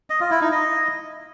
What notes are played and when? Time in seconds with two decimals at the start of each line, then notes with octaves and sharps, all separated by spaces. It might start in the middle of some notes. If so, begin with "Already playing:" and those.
0.10 D#5
0.20 F4
0.31 E4
0.41 D#4
0.52 D#5